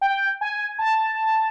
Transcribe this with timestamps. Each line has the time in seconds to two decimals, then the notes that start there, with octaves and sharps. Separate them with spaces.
0.01 G5
0.41 G#5
0.79 A5